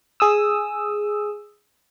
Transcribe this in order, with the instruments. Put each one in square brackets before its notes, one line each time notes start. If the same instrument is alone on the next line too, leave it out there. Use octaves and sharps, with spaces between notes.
[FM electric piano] G#4 D#6 E6